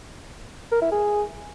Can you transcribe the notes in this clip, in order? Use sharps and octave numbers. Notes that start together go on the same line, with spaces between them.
A#4
E4
G#4